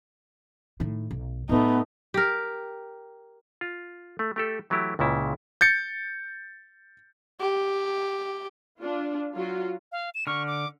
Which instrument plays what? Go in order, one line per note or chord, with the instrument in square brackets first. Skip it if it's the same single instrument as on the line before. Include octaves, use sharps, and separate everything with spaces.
[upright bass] A2 D#3
B1
[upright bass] A2 F4 [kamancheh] A3 D#4 [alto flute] B3
[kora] G4 A#4
[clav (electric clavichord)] F4
A3
A3 G4 A4
E3 F#3 A3 E4 G4
C#2 A#2 C#3 E4
[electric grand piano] G6 A6 C#7
[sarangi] G4
[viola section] D4 F4
F#3 F4 F#4
[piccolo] F5
E7
[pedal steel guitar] D3 F6 [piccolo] C#6
[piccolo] D6